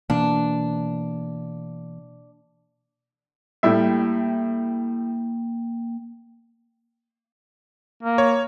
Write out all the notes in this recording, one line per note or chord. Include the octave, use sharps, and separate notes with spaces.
B2 E3 A#3 D4
A2 G3 A#3 E5 G5
A#3
C#5